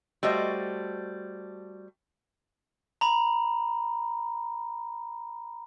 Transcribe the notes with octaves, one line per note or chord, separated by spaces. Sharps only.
G3 A3 F#4 C5 D#5
A#5 B5